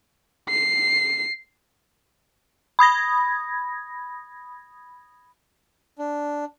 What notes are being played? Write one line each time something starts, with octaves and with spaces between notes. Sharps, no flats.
C7
B5 D#6 G#6 A#6
D4